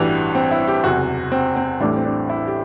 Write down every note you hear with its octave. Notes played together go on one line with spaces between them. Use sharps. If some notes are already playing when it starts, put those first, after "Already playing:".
Already playing: A1 G2 E3 G3 F#4
C4
E4
G4
F#1 E2 C3 F#4
C4
C4
A1 A2 E3 G3 D4
C4
D4
E4
G4